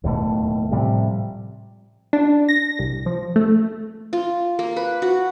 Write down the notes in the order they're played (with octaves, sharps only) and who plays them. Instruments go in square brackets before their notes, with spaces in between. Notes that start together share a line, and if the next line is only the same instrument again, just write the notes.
[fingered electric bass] D1 D#2 B2 A3
A2 C3 F3 G3
[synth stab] D4
A#6
C2
F3
A3
[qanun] F4
A#3
B4
F#4